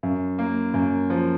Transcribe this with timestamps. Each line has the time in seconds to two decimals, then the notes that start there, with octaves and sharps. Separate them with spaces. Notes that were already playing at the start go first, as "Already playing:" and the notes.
0.03 F#2
0.39 A#3
0.74 F#2
1.10 F3